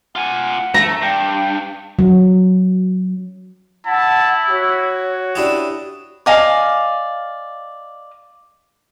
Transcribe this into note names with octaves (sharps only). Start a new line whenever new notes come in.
F4 F#5 G#5
A3 A#5
G2 G5
F#3
E4 F#5 A5
F#4 C#5
D4 E4 G4 D#6
D5 D#5 F5 G#5